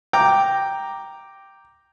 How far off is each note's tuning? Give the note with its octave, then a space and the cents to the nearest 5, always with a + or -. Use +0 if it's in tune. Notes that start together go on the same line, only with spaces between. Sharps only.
G5 +0 A#5 +0 D6 +0